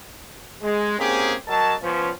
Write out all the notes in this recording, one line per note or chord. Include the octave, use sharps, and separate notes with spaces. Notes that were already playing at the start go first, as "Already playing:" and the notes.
G#3
G#2 A#3 C4 C#4 G4 G#4
F#3 A#4 D#5 A5
F3 B3 C#4